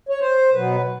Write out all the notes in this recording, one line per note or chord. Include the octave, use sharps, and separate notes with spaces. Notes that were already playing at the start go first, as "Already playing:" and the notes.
C#5
C5
B2 F#3 B3 B4